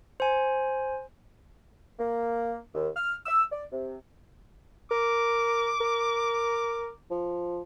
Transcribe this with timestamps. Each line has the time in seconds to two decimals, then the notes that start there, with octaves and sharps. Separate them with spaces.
0.20 C5 G#5
1.99 A#3
2.75 D#2
2.95 F6
3.26 E6
3.51 D5
3.72 C3
4.91 A#4 D6
5.81 A#4
7.11 F3